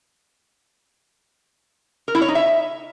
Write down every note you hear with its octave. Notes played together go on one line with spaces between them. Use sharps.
A#4
E4
C#5
D#4
E5